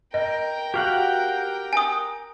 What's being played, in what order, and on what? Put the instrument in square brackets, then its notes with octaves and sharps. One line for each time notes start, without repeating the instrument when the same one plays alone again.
[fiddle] A#4 G5 [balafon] D#5
[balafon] F#4 [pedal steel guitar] G4 F5 F#5
[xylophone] G#5 D#6